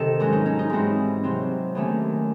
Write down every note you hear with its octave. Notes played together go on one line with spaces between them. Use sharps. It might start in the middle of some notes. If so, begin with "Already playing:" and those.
Already playing: C3 D#3 A4 D#5
G#2 F#3 C#4 F#4
D#4
C#4
D#4
G#2 E3 C4 F#4
C3 F#3 C4
D#2 D#3 A3 C#4